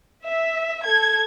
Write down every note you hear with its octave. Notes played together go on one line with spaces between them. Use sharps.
E5
A4 G#6